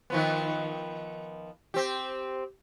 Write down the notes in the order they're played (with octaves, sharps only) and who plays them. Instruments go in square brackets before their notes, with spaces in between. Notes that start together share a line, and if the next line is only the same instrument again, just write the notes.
[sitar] D#3 F3 B3
C4 G4